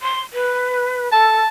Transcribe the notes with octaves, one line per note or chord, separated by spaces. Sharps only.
C6
B4
A4 A5